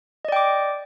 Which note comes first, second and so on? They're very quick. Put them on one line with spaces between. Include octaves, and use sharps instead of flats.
D#5 D5 G5 D6